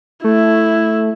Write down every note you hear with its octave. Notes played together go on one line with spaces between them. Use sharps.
A3 E4